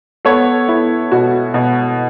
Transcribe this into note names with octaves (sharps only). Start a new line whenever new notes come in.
B3 A4 C#5
B3 E4
B2 F#4
B2